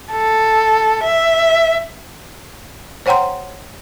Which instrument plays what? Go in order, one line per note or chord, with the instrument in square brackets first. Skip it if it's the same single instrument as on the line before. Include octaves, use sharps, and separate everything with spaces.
[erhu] A4
E5
[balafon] C5 C#5 F#5 G5 A#5 C6